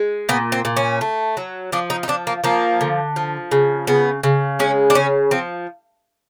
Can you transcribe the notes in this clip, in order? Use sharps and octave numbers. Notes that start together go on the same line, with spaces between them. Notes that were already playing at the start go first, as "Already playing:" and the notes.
Already playing: G#3
A#2 B3
C4
A#2
C#4
A3
F#3
F3 D4
D#4
D#4
F3 D4
A#3
F3 A#3
D3
F3
C#3
C#3 B3
C#3
G#3 C#4
D4
C#3 C#4
F3 C4